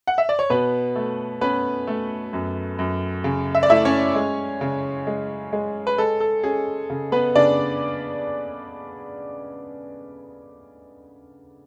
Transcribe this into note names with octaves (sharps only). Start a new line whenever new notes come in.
F#5
E5
D5
C#5
B2 B3 B4
A3
B3 C#4 B4
A3
F#2
F#2
C#3
E5
D5
A3 E4 E5
C#4 C#5
G#3
C#3
G#3
G#3
B4
G#3 A4
A4
C#4 G#4
C#3
B3 B4
C#3 D4 D5